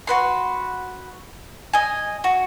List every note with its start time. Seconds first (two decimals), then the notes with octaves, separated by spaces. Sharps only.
0.07 F#4 B4 C6
1.73 D#5 G#5
2.24 F#4